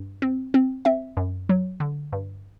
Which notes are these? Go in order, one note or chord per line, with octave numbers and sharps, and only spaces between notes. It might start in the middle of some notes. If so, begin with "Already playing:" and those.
Already playing: G2
C4
C4
C4 E5
F#2
F#3
D3
G2